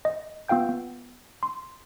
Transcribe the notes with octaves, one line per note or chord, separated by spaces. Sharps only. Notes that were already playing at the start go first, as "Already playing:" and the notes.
D#5
B3 F4 F5 G5 G6
B3
C6